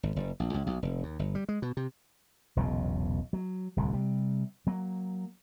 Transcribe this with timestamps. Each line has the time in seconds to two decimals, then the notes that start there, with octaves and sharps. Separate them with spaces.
0.03 G#1
0.16 F#1
0.40 A#1
0.54 C#2
0.67 B1
0.83 F1
1.03 D#2
1.19 G1
1.35 G3
1.49 G#3
1.62 B2
1.77 C3
2.56 E1 B1 A#2 C#3
3.33 F#3
3.77 D1 C2 C3
3.93 C3 G3
4.67 F#3 A#3